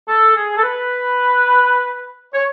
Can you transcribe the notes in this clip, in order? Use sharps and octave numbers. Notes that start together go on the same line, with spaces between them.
A4
G#4
A4
B4
C#5